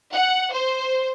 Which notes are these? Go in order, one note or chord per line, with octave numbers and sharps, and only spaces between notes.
F#5
C5